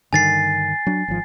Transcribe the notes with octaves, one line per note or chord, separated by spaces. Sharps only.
G2 D3 D#3 G#5 A6 C7
F#3 D4
G#1 F3